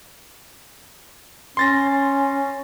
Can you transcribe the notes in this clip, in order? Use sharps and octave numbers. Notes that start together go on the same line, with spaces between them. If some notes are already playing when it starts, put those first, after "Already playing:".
C#4 C6 A6 A#6